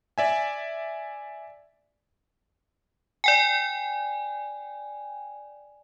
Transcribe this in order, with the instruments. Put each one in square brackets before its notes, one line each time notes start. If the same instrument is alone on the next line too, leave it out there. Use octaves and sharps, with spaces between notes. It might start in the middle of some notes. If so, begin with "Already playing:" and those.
[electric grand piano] D5 E5 G#5
[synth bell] D5 G5 G#5